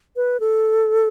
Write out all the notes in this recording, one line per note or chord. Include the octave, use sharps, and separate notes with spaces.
B4
A4